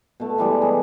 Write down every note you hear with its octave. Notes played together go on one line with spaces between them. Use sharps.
B2 A3
E3 G3 G#3
G#4